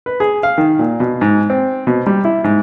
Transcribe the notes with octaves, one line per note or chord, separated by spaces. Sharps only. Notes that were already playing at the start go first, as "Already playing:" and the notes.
B4
G#4
F5
D#3
A#2
B2
G#2
C4
B2
G3
E4
G#2